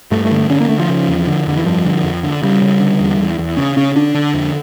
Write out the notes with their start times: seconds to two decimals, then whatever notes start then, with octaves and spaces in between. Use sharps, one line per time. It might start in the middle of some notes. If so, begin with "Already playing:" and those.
0.11 G2 A3
0.25 A3
0.31 D3
0.37 A3
0.49 D3 C#4
0.60 A#3
0.69 D3 A3
0.79 F3
0.89 C#3
1.08 E2
1.27 D3
1.46 F2 D3
1.57 E3
1.65 G2 F3
1.85 D3
2.03 F2
2.23 D3
2.43 C#3 G3
2.62 C#3
2.80 D3
3.00 E2
3.19 E2
3.39 E2
3.57 C#3 C#4
3.77 C#3 C#4
3.96 D3 D4
4.14 D3
4.34 F2